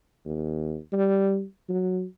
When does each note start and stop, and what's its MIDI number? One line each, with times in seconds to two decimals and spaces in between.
0.25 0.76 39
0.93 1.44 55
1.69 2.04 54